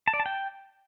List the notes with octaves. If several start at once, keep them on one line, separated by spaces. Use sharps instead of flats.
A5
D5
A5
G5